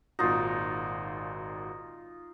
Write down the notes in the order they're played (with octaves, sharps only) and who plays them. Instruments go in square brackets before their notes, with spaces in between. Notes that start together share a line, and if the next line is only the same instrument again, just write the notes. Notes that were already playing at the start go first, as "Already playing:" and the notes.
[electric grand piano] G#1 A#2 F#4 [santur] D#4 F4